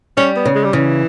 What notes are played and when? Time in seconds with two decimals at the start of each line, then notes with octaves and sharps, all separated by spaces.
0.17 G3 C#4
0.36 B3
0.45 C#3
0.55 G#3
0.64 G3
0.73 C#3 E3